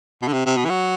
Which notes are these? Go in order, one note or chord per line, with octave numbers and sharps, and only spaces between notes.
B2
D3
C3
C3
B2
E3
F#3